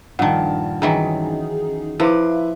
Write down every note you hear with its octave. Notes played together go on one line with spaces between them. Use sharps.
A#1 G2 A#2 D#3 F#5 A5
D#3 E3 F#3 C#4 D#4 G#4
F3 E4 B4 E5 D6